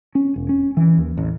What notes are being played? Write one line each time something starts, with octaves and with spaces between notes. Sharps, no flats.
C#4
E1
C#4
E3
D#2
A1